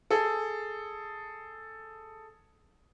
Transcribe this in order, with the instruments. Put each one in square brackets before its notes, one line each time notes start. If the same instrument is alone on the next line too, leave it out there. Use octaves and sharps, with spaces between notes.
[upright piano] G#4 A4